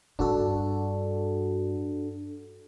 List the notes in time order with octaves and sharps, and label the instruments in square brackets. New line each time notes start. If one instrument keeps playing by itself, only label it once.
[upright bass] G2 [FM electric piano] D4 F#4 A4